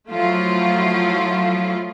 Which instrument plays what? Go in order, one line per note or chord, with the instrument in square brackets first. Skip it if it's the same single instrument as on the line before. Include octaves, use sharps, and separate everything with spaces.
[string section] F3 F#3 A3 E4 F4